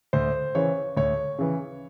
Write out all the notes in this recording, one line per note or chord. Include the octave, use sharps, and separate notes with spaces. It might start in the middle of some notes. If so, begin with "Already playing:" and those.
D2 C5
C#3 E3 C#5
D2 C#5
C#3 E3